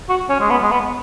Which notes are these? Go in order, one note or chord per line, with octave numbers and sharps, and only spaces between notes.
F#4
C#4
G#3
B3
G#3
B3